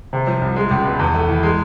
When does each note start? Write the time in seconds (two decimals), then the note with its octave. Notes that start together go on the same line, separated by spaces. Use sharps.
0.13 C3
0.27 F3
0.42 C2
0.56 G#3
0.71 C#2
0.85 B2
0.99 E2
1.14 A3
1.29 E3
1.43 G#3